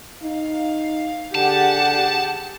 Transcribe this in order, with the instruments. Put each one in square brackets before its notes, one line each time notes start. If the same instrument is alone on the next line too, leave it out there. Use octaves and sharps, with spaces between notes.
[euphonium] D#4 [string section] F5
[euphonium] D3 [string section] G4 G#4 F#5 [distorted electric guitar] A5